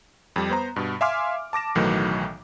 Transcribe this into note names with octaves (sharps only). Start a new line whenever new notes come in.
F2 G3
B3 C5 A#5
G2 B2
E5 F5 G#5 C6 D6 F6
A5 D6 A#6 E7
B1 A2 D#3 E3 F#3 A3